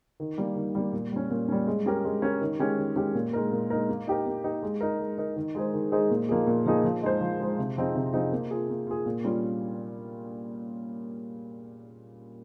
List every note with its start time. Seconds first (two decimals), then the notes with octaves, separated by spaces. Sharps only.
0.20 D#3
0.38 G3 A#3
0.56 D#3
0.75 G3 A#3
0.93 A#2
1.12 G3 C#4
1.30 A#2
1.49 G3 C#4
1.67 G#3
1.86 C#4 G4 A#4
2.05 G#3
2.22 C#4 G4 A#4
2.41 D#3
2.60 G#3 C#4 G4
2.78 D#3
2.96 G#3 C#4 G4
3.15 A#2
3.33 G#3 D#4 A#4
3.52 A#2
3.70 G#3 D#4 A#4
3.89 A#3
4.07 D#4 G4 A#4
4.26 A#3
4.44 D#4 G4 A#4
4.63 G#3
4.81 D#4 A#4
4.99 G#3
5.18 D#4 A#4
5.36 D#3
5.55 G#3 D#4 G#4 C5
5.73 D#3
5.92 G#3 D#4 G#4 C5
6.11 A#2
6.29 F3 A#3 D#4 G#4
6.47 A#2
6.66 F3 A#3 D#4 G#4
6.84 F3
7.03 G#3 D#4 G#4 C5
7.21 F3
7.40 G#3 D#4 G#4 C5
7.58 C3
7.77 F3 C4 D#4 G#4
7.95 C3
8.14 F3 C4 D#4 G#4
8.32 A#3
8.51 F4 G#4
8.69 A#3
8.87 F4 G#4
9.06 A#2
9.24 G3 C#4 F4